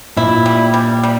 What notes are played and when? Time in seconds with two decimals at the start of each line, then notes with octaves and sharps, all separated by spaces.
0.16 A#2 E4
0.46 G3
0.74 G3
1.04 G3